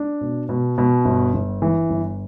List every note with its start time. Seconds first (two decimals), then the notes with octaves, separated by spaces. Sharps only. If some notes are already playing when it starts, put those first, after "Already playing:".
Already playing: D4
0.21 B2
0.49 B2
0.78 B2
1.05 G1
1.34 G1
1.62 E3
1.90 G1